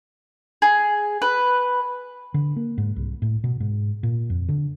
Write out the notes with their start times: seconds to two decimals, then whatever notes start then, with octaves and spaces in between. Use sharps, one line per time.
0.62 G#4
1.22 B4
2.34 D3
2.56 A#3
2.78 G#2
2.96 C2
3.22 A2
3.44 B2
3.60 G#2
4.03 A#2
4.30 F2
4.49 D3